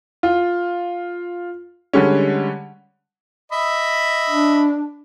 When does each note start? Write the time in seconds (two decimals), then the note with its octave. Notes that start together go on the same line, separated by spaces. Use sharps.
0.23 F4
1.93 D3 G3 G#3 C#4
3.52 D#5 E5 B5
4.30 D4